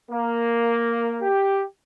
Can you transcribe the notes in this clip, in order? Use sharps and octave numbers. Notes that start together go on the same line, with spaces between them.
A#3
G4